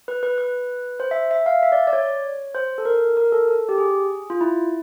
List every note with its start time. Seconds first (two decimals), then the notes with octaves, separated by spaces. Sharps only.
0.08 B4
0.23 B4
0.38 B4
1.00 C5
1.11 E5
1.31 E5
1.46 F5
1.63 E5
1.72 D5
1.87 D5
1.93 C#5
2.55 C5
2.78 A4
2.85 A#4
3.17 A#4
3.32 A4
3.48 A4
3.69 G4
3.78 G#4
4.30 F4
4.41 E4